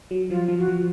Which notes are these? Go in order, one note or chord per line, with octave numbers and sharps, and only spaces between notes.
F#3
F3 F4
F3
F#4
F3